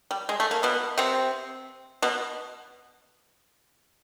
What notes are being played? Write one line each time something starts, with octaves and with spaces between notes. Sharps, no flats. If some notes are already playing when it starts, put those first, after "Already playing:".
G3
G#3
A3
A#3
B2 B3
C3 C4
B2 B3